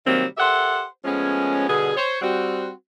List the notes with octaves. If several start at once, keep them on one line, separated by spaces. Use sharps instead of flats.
C3 D#3 F#3 G3 A#3 C4
G4 A4 A#4 C5 E5 F#5
F3 G#3 A3 B3 C#4
B2 D3 G3 B3 G#4
C5 C#5
G3 C4 F#4